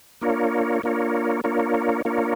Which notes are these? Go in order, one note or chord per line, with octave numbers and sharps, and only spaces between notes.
A#3 D4 F4 A#4 C#5
A#3 D4 F4 A#4 C#5
A#3 D4 F4 A#4 C#5
A#3 D4 F4 A#4 C#5